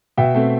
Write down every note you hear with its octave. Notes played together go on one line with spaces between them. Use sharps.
B2 E5 G5
A3 C4